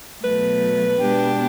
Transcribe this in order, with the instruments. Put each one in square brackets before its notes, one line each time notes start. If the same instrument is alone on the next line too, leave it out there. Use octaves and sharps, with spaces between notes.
[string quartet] B2 F#3 A3 [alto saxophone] B4
[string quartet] B2 G#3 B3 D4 G4